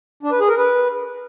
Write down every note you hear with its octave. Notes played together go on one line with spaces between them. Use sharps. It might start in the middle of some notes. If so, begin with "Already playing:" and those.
D4
B4
G#4
A#4
B4